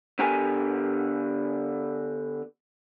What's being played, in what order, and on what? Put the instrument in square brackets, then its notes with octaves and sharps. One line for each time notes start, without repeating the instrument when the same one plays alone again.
[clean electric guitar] D3 B3 G4 A#4 B4 G#5